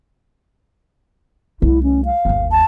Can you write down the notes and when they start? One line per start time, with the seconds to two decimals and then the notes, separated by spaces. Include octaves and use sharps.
1.62 C2 A3 E4
1.83 C#4
2.05 F5
2.25 G1 D#2
2.52 A5